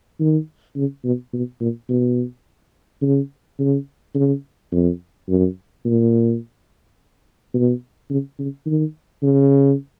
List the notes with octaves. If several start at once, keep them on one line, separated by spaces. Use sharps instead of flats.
D#3
C#3
B2
B2
A#2
B2
C#3
C#3
C#3
F2
F#2
A#2
B2
C#3
C#3
D#3
C#3